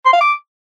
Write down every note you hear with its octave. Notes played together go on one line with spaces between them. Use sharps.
C6
F5
D6